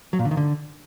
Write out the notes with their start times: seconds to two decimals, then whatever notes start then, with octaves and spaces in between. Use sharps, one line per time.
0.13 F#3
0.19 A#2
0.25 D3
0.31 D#3
0.37 D3